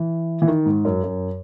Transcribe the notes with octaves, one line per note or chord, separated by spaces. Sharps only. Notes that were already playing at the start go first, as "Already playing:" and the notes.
Already playing: E3
E3
D#3
G#2
F#2
F#2